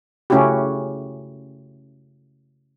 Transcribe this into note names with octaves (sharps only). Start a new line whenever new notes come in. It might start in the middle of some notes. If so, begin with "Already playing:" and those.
C#3 A3 C#4 E4 F#4 G4